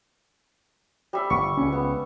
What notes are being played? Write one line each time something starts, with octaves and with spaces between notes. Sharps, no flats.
G3 E5
G1 C#6
C#2 C#4
B3